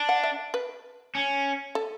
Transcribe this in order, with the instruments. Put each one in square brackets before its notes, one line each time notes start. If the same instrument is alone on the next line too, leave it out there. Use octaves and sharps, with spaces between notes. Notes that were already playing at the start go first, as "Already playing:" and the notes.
Already playing: [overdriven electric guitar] D4
[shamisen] F#5
E5
B4
[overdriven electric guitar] C#4
[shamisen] A4